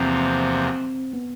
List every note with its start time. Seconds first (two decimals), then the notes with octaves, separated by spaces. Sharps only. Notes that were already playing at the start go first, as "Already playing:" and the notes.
Already playing: E2 C3 F3 A#3 C4
1.13 B3